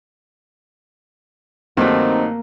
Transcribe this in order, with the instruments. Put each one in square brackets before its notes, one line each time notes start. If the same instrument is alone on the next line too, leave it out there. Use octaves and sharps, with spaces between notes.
[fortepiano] G2 F#3 A3 [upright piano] D#3 C4 [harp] A#3 [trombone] D#4